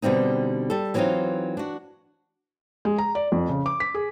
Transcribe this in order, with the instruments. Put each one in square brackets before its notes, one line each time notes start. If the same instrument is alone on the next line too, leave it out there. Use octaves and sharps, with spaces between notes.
[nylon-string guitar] B2 D3 G3 C4 D#4
G3 A4
E3 F#3 B3 C4 D#4 F4
D4 F#4
[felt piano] G#3
A#5
D5
F2
C#3
D6
B6
G#4